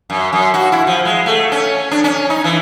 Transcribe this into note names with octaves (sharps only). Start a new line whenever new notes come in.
F#2
F#2
F#4
E4
F3
G#3
A3
C#4
D4
C#4
D#4
E3